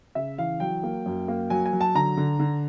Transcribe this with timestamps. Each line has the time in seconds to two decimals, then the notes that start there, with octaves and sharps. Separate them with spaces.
0.15 C#3 E5
0.38 E3 F5
0.60 F#3 G5
0.83 A#3
1.06 F#2
1.28 A#3
1.50 F#3 G#5
1.66 G#5
1.73 F#3
1.81 A5
1.95 D3 A#5
2.17 D3
2.39 D3